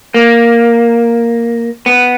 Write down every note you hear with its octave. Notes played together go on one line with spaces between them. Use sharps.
A#3
B3